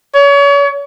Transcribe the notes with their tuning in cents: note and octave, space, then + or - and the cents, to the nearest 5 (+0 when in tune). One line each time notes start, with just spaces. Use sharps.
C#5 +35